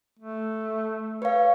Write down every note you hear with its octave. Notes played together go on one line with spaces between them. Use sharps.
A3
B4 C#5 F5